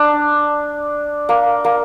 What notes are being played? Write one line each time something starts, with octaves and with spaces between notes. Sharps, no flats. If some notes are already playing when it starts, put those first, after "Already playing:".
Already playing: D4
A#3
A#3